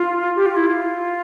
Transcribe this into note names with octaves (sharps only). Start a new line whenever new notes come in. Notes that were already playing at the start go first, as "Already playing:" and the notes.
Already playing: F4
G4
F4
E4
F4